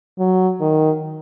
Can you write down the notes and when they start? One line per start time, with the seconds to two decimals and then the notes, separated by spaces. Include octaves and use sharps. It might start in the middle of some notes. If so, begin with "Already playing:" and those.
0.19 F#3
0.61 D#3